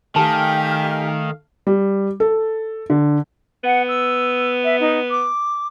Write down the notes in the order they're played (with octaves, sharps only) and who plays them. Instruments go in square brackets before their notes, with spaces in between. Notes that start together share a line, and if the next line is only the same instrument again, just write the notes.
[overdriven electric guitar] D#3 [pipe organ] A3 F5 [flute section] G4 G#5 F6 [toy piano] A5
[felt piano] G3
A4
D3
[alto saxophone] B3 [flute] F#5
[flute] E6
E5
D#4
D6